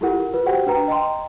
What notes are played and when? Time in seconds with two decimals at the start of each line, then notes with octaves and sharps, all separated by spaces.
0.01 E4 F4 G4 A4 A#4 F#5
0.34 F4 B4
0.46 F#4 G4 C5 F#5 G5
0.66 D4 B4 G5 A#5
0.88 D#5 G5 A#5 C6